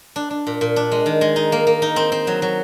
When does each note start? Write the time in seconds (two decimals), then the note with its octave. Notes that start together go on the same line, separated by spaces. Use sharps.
0.16 D4
0.31 D4
0.47 A#2
0.61 A#2
0.76 D4
0.92 G#3
1.06 D#3
1.21 G#3
1.36 D#4
1.52 A#3
1.67 A#3
1.82 D#4
1.96 C4
2.12 C4
2.27 F#3
2.42 F#3